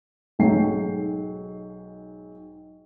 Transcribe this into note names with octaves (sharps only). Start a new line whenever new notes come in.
B1 G#2 F#3 G5 C7